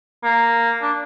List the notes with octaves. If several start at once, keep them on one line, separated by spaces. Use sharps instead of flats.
A#3
D4